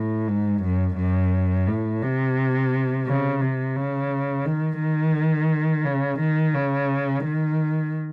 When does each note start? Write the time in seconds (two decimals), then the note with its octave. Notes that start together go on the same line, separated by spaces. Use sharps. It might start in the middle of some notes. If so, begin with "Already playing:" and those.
Already playing: A2
0.28 G#2
0.63 F#2
0.97 F#2
1.67 A2
2.02 C3
3.07 C#3
3.41 C3
3.76 C#3
4.46 D#3
4.80 D#3
5.85 C#3
6.20 D#3
6.54 C#3
7.24 D#3